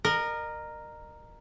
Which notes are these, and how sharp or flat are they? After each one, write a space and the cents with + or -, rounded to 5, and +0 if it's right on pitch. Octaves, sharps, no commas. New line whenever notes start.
A#4 +0 D#5 -40